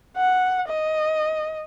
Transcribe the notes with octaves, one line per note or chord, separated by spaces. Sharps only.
F#5
D#5